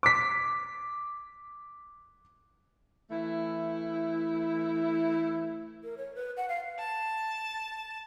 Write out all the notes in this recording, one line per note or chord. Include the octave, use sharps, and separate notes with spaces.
D6 B6
E3 A3 E4
A#4
C#5
B4
F#5
F5
A5